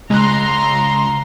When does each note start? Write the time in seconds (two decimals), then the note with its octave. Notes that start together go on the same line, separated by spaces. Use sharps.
0.10 C#2 G#3 A#5 C6 F#6